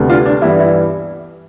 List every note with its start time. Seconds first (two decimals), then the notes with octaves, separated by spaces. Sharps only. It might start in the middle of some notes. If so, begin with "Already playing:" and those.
Already playing: D2 C3 G3 B3
0.10 D4 F4
0.26 D4
0.42 G2 E3 G3 B3 E4
0.60 E4